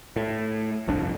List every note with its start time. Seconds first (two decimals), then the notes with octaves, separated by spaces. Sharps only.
0.16 A2
0.88 G1 C2 F2 D4